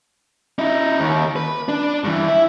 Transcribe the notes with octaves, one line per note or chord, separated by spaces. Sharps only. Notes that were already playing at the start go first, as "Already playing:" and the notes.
D#4 E4
D#2
B4
D4
G2 E3
E4 E5